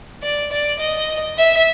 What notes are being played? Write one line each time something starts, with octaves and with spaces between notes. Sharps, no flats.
D5
D5
D#5
E5